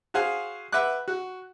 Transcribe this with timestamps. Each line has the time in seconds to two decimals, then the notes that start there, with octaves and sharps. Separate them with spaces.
0.14 F#4 G#4 C5 F5 G#5
0.72 B4 E5 F#5 D6 F#6
1.08 F#4